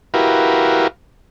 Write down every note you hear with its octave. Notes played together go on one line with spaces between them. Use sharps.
E4 F#4 G4 A#4 B4 F5